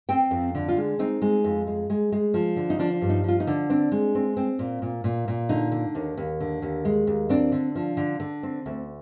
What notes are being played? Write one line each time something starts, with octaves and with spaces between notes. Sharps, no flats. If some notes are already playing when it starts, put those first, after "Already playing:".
C4 G5
F2
D3
F4
G#3
C4 D#4
G#3
F2
G#3
G#3
G#3
F3
D3
D#4
F3 D4
G2
D#4
F3 F4
D#4
D3
C4 D4
G#3
C4
C4
A#2
A#2
A#2
A#2
D3 D#4
D3
D#2
D#2
D3
D#2
G#3
D#2
C4 D4
D3
F3
D3
D3
C4
D2